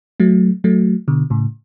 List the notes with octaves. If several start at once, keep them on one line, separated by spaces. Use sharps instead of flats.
F#3 A3
F#3 A3
B2 D3
A2 C#3